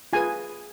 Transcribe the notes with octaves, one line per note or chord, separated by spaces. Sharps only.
F4 G#4 B4 G#5